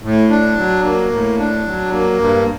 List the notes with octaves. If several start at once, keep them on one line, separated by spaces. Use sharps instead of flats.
A2
D4
F#3
A#3
A2
D4
F#3
A#3
G2